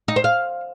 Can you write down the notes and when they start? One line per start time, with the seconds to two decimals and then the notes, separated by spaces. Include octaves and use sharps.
0.08 D#4
0.16 C5
0.24 F5